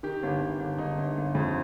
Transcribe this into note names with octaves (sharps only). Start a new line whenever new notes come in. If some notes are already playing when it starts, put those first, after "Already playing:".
D#3 G4
G1
G1
G1
G1 D#4
G1
G1
F2